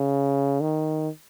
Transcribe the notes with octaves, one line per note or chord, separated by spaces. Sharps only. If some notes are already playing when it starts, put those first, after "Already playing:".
Already playing: C#3
D#3